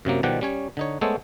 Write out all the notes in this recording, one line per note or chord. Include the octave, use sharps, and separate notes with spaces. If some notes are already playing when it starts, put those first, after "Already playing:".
F#2 C3 F#3 A#3
B2 D#3 F3 G3 G4 F#5
G3 C#4 C#5
D3 D#4 C#5
G#3 A3 B3 A4 C5 C#5